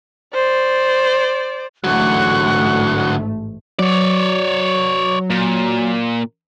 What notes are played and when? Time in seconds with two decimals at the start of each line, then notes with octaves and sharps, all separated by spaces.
0.34 C5 D5
1.84 A1 G#2 D3 F#3 A3 F#5 C#6 F#6
3.79 F#3 C#5 D5
5.30 A#2